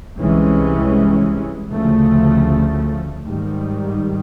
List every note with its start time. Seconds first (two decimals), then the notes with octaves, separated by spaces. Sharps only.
0.17 C2 C3 E3 G#3 C#4
1.70 D2 C#3 F3 A3
3.24 G#2 D#3 G3